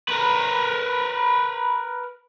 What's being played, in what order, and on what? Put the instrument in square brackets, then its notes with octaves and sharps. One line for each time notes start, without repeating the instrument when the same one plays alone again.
[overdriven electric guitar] A#4 B4